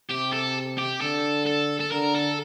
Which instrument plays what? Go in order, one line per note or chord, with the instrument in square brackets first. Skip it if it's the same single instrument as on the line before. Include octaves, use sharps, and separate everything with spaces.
[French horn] C3 [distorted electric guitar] G4
[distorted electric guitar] A4
G4
[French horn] D3 [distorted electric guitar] A4
[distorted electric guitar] A4
A4
[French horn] D3 [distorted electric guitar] A#4
[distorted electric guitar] A4